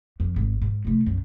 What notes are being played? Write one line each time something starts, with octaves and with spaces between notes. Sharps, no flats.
F2
G#1
G#2
C3 A3
B1 F#2